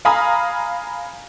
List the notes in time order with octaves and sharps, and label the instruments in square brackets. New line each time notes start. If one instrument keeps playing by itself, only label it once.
[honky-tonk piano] F5 G#5 A#5 B5 D#6